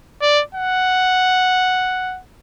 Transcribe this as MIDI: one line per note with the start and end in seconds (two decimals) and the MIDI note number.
0.22 0.42 74
0.55 2.20 78